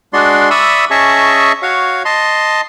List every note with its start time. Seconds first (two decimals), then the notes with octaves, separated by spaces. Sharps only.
0.13 G#3 D4 F#4 D5 C6
0.50 D5 E5 B5 C#6 D#6 E6
0.91 C#4 G#4 D#5 E5 A5 C#6
1.62 F#4 C#5 F5
2.05 D#5 A5 C6